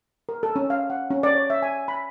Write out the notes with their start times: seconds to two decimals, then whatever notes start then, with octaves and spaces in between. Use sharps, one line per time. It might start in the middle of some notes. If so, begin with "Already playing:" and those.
0.29 A#4
0.43 A4
0.56 C#4
0.70 F5
0.90 F#5
1.10 C#4
1.23 D5
1.35 C#5
1.50 E5
1.62 G#5
1.88 B5